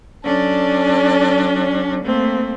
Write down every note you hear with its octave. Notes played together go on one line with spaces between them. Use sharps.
F#3 C#4 D4 A4 D5
A3 A#3 C4